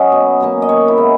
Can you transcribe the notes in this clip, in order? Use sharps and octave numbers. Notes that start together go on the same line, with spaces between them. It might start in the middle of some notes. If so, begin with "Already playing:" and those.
Already playing: F#3 C#4 D#5
B2
F#3 A#3 C#4
D#5
D#3 C#5
E4
G#3 B3 D#4